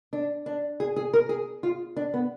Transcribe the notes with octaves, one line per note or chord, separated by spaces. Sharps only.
D4
D4
G#4
G#4
A#4
G#4
F4
D4
B3